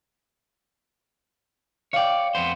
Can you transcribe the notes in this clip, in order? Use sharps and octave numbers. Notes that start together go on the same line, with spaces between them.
C#5 D5 F5 G5
F2 B3 C5